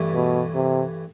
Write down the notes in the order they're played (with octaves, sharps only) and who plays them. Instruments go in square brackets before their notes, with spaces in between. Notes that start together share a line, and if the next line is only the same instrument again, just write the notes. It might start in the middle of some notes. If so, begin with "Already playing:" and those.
Already playing: [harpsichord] G2 E3 A3
[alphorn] B2
C3